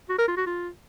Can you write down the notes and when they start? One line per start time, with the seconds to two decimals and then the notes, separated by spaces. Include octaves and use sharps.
0.09 F#4
0.18 A#4
0.28 F4
0.37 F#4
0.46 F4